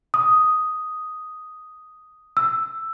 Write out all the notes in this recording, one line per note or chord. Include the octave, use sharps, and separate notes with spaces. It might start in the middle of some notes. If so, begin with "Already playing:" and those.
D#6
E6